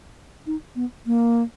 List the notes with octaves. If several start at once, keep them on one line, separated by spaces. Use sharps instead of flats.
D#4
B3
A#3